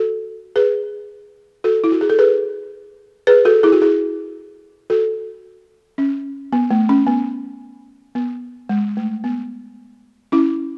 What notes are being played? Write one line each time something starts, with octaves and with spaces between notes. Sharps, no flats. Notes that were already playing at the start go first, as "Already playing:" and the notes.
Already playing: F#4 A4
G#4 B4
F#4 A4
E4
F#4
G#4
A4
G#4 B4
G#4 B4
F#4 A4
E4 G#4
F#4
E4 G#4
F#4 A4
C#4
B3
A3
C#4
B3
B3
G#3
A3
B3
C#4 E4